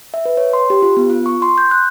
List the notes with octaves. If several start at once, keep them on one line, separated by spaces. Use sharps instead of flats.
E5
B4
C#5
C6
G4
F4
B3
F4
C#6
C6
G6
F#6